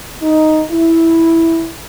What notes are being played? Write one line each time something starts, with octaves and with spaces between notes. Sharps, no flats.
D#4
E4